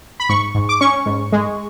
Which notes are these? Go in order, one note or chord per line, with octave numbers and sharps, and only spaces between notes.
B5
G#2 C#6
G#2
D6
C#4 C#6
G#2
G#3